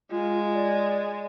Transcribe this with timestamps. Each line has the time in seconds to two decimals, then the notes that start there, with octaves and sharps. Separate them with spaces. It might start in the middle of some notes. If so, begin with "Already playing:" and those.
0.11 G#3 F4
0.54 D5